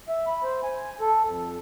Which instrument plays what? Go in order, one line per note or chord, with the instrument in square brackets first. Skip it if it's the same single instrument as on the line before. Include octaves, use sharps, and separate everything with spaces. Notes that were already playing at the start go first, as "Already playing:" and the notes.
[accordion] E5
B5
C5
G#5
A4
F2